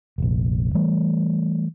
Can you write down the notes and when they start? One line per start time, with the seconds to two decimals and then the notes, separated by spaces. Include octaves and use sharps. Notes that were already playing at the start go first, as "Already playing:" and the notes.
0.18 F1 A#1
0.74 E3 G3 A3